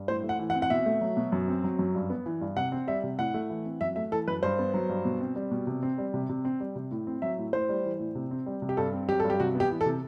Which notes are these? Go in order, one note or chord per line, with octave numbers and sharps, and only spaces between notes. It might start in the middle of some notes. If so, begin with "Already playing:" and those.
Already playing: G2
A2 C5
A3
F#5
E3
F#5
C4
F#5
B2 E5
A3
F#3
B2
F#2
C4
F#3
F#2
G2
B3
E3
G2
C3 F#5
C4
G3 E5
C3
A2 F#5
A3
E3
C4
F#2 E5
A3 E5
E3 A4
F#2 B4
G2 C5
B3
F#3
G2
B2
C4
G3
B2
C3
C4
G3
C3
C3
C4
G3
C3
A2
C4
F#3 E5
A2
A2 C5
G3
E3
A2
C3
C4
G3
C3
G4
G2 A4
C4
F#3 G4
G2 A4
G4
C3 F#4
B3
G4
E3
A4
C3